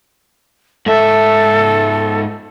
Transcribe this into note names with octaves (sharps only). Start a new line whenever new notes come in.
G#2 A4 E5